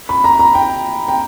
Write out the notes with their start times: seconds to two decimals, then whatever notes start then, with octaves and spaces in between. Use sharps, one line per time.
0.09 B5
0.24 A#5
0.39 A#5
0.55 G5
1.08 G5